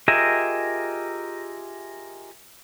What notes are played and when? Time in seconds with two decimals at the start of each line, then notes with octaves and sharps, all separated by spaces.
0.08 F4 G4 G#4 A#4 D#5 E5